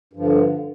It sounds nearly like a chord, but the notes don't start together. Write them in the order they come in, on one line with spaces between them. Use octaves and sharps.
G2 F3 D3